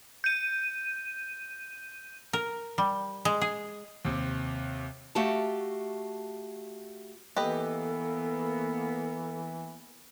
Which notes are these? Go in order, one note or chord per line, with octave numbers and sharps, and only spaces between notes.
G6 D#7
A#4
G3
G#3
G#4
D#2 C3
A3 F#4 G4 F5 A5
E3 A#3 B3 G4 A4 B4 D#5